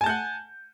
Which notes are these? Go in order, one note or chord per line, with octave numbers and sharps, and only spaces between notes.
F#5 G#5 A5 G6